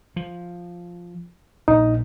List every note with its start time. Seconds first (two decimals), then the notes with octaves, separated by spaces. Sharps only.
0.16 F3
1.68 A#1 D#4